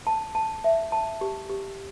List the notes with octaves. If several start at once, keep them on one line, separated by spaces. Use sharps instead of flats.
A5
A5
E5
A5
G4
G4